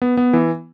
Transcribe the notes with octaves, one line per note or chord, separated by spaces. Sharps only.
B3
B3
E3